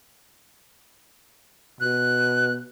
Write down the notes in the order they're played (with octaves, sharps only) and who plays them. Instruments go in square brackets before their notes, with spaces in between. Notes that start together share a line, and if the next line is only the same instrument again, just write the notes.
[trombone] B2 [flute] F#6